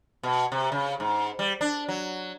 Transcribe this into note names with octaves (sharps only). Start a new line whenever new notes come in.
B2
C3
C#3
G#2
G3
D4
F#3